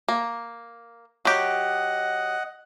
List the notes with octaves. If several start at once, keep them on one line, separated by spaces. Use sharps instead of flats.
A#3
F#3 G4 D#5 F#5